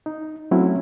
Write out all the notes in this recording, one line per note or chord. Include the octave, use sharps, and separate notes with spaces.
D#4
F#3 A3 C4 C#4 E4